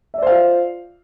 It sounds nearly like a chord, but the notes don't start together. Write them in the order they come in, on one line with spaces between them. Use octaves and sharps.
E5 D5 C5 F5 F4